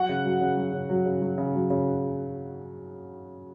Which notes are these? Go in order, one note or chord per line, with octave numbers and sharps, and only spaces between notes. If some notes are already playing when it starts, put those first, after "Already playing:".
Already playing: F#3 F#4 F#5
C#3
F#3
C#3
F#3
C#3
F#3
C#3
F#3
C#3
F#3
C#3